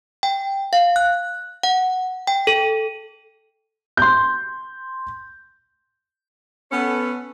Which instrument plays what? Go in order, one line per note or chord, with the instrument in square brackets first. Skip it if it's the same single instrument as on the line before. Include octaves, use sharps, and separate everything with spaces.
[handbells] G5
F5
F#6
F#5
G5
A4
[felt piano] C6 G6
[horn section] B3 C#4 A4